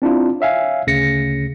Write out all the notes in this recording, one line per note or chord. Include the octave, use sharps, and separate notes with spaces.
C4 D4 E4 F4
C#5 E5 F5 G#5
D2 C#3 A#6 C#7